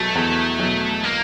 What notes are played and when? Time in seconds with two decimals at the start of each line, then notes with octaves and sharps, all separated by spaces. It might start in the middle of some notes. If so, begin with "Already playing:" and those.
Already playing: E2 B2 F#3 A3
0.15 E2
0.59 B2 F#3
1.04 A#3